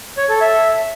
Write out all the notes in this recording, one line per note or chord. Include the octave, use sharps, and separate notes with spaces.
C#5
A4
E5